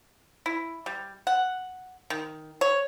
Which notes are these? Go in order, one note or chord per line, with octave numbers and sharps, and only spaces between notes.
E4
G3
F#5
D#3
C#5